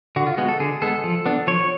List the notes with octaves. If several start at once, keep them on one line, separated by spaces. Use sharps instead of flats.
D3 F#4
F4
G#3 B3 F#4
A4
D3 G#4
G#3 B3 A4
F3
B3 D4
F3 C#5